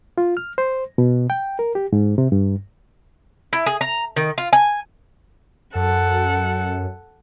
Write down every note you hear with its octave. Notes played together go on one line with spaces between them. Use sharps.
F4
F6
C5
B2
G5
A#4
G4
G#2
C3
G2
E4
G#4
A#5
D#3
F4
G#5
F#2 A4 F#5